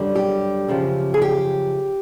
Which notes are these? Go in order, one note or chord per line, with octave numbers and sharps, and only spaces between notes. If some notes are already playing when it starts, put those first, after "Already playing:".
Already playing: F#2 D3 G3
G4
F#2 C#3 F3
G#4
G4